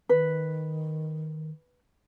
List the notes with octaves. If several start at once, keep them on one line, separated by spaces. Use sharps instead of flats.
D#3 B4